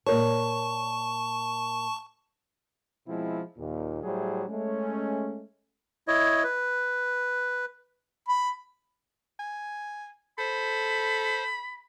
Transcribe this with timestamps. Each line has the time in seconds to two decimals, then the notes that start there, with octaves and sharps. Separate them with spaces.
0.06 A#2 A#4 C#5 A5 C#6
3.07 B2 F3 G#3 C4 E4
3.58 D#2 A#2
4.03 A2 F#3 G3 E4 G#4 C5
4.49 G#3 A3 C#4
6.08 E4 C#5 D#5
6.44 B4
8.28 B5
9.39 G#5
10.38 A4 C5 B5